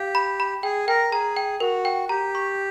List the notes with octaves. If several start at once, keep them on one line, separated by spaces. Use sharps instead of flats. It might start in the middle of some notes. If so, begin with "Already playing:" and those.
Already playing: G4 F5
B5
B5
G#4 G5
A#4 G5
G#4 A#5
G5
F#4 A#4
G5
G4 A#5
C#6